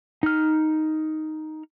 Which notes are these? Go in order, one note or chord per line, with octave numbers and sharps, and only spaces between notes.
D#4 F6